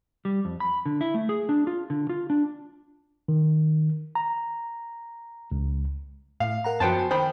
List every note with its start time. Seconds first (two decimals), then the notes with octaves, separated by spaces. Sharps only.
0.25 G3
0.45 F2
0.60 B5
0.86 D3
1.01 E4
1.15 A3
1.29 G#4
1.49 D4
1.67 F4
1.90 D3
2.09 F4
2.30 D4
3.28 D#3
4.15 A#5
5.52 C#2
6.40 A2 F5
6.64 A#4 F#5 A#5
6.80 F#2 F3 B3 F#4 C5 G5 A5
6.99 G#5
7.11 D#3 C5 G5 B5